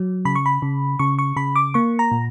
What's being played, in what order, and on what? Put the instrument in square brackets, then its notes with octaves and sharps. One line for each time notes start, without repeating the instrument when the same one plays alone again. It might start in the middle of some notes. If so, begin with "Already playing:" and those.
Already playing: [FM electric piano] F#3
C#3 B5
C#6
B5
C#3
C#3 C#6
C#6
C#3 B5
D6
A#3 C#6
A#5
A#2